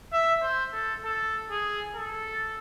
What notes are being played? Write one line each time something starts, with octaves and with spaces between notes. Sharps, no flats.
E5
C5
A4
A4
G#4
A4